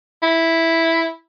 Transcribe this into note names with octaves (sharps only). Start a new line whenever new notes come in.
E4